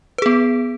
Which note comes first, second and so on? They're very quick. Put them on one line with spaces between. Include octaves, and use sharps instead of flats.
B4 G#4 B3